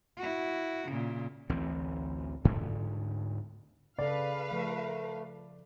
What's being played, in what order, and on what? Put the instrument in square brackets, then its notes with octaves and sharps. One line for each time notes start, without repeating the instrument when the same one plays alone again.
[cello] E4 F#4
A#2 C#3
[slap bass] A1 D2 E3 C4
D2 G#2 D3
[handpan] C#3 A4 [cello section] B4 F5 [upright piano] D5
[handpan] F3 [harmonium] A3